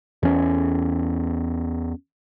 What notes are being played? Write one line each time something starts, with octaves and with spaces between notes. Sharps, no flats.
E2 C#4